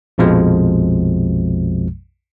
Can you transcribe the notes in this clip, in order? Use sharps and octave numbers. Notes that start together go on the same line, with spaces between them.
A#1 F2 B2 F3 G#3